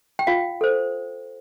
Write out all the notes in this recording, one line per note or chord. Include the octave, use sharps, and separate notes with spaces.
G5
F4 F5
A4 C5